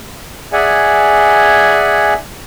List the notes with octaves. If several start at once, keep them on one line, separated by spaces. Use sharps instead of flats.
G#4 D5 E5 F#5 G#5